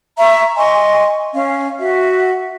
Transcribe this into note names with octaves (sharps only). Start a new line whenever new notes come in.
E5 A#5 C#6
D#5 G#5 C6 C#6
C#4 F5
F#4 E5